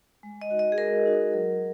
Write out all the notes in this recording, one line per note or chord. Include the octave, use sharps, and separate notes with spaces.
G#3
D#5
D#4 F#4
D#5
G#4
G#3 A#4
D#4 F#4
F#3